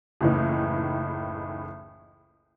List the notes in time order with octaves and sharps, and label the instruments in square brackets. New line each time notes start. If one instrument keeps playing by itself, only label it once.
[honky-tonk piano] F#1 C#2 A2 E3 D#4